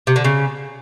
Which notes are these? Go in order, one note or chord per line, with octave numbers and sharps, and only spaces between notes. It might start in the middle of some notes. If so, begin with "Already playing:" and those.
C3
D3
C#3